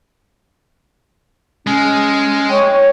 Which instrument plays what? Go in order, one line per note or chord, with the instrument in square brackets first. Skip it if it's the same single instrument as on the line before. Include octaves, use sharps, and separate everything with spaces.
[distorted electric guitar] G#3 [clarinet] C#4
[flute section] C#5 C#6 [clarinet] G5